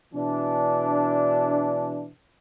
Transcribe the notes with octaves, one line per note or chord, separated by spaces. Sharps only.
B2 E3 D4